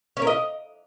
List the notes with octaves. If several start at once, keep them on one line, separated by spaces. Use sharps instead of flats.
C#4
A#4
D#5